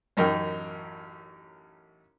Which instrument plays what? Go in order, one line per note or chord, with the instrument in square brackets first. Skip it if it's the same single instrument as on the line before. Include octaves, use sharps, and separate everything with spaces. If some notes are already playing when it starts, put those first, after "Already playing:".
[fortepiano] A1 F#2 D#4 A#4 G5